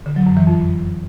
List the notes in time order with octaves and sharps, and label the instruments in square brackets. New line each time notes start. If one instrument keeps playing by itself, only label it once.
[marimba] D3
F#3
F#2
E3
F2